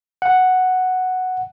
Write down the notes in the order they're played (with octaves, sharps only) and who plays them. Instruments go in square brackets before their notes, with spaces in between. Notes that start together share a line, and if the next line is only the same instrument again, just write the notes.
[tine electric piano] F#5